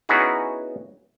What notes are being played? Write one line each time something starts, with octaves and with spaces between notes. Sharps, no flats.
B3 C#4 D#4 E4 F#4 G#4